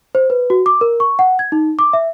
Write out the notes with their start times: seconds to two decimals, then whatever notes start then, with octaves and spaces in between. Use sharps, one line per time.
0.15 C5
0.30 B4
0.50 F#4
0.66 D6
0.81 A#4
1.00 C#6
1.19 F#5
1.39 G#6
1.52 D#4
1.79 D6
1.93 E5